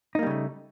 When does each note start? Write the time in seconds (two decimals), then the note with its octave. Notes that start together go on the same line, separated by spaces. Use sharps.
0.15 D#4
0.19 A#3
0.23 G3
0.27 C#3
0.30 A3